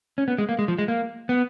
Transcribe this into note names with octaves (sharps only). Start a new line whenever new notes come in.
C#4
B3
G#3
A#3
G#3
F3
G#3
A#3
B3